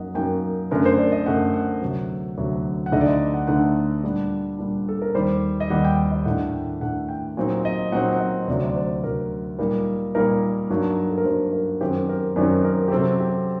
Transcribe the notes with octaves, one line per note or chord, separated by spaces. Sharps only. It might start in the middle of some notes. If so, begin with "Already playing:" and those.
Already playing: F#2 F#3 A#3 D#4 D#5 F#5
F#2 F#3 A#3 D#4 G5
F#2 D3 A3 A#4
C5
D5
D#5
F#2 D3 A3 F#5
F#5
D2 C3 F#3
D2 C3 F#3
F#5
D2 D3 A3 D#4 D#5
D5
D#5
F#5
D2 D3 A3 D#4 F#5
A#2 G3 D4
A#2 G3 D4
A4
A#4
D#2 D#3 G3 C5
D#5
D#2 D#3 G3 F#5
G5
D#5
A2 A3 D4 F#5
F#5
G5
A2 A3 D4 F#5
G5
A#2 F#3 C4 D#4
D#5
A#2 F#3 C4 D#4 F#5
F#5
D#5
D2 C3 F#3 D5
D5
C5
D2 C3 F#3 A#4
A#2 G3 A#3 D#4
A#2 G3 A#3 D#4 A#4
G2 F#3 A#3 D#4
A4
A#4
G2 F#3 A#3 D#4 C5
A#4
F#2 D#3 F#3 C4 D#4 G4
A#4
F#2 D#3 F#3 C4 D#4 D5
A#4
G4
C3 F#3 C4 A4
G4